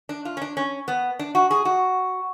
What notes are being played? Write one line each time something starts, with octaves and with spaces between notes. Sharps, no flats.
D4
F4
C#4
D4
C#4
B3
D4
F#4
G#4
F#4